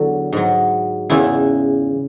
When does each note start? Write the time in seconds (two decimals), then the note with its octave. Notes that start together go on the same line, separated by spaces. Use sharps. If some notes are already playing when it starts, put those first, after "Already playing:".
Already playing: E2 D3 F#3 F#4
0.33 G#2 F#3
1.10 E2 C#3 E3 E4